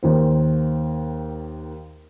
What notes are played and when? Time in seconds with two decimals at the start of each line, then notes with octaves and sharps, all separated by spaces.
0.03 D#2 D#3 C5